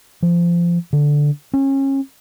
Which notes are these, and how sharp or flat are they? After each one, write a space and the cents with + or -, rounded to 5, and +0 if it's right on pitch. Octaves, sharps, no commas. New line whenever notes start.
F3 -20
D3 -5
C#4 -30